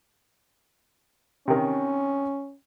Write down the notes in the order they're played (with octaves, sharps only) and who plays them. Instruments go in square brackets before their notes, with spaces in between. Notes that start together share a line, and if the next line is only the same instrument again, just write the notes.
[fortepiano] C3 D#3 [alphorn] C#4